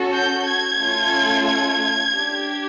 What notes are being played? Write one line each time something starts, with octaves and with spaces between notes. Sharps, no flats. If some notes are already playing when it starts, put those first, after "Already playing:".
Already playing: C#4 F#4 A4
G6
G#6
A3 C#4 F4 A4
G#6
D4 G4